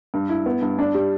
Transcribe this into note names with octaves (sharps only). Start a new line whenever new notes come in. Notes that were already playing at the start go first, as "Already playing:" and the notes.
G2
E4
B3
G2
D4
G3